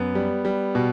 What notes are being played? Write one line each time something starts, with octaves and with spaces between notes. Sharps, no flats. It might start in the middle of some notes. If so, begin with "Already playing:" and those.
Already playing: F#2 B3
G3
G3
B2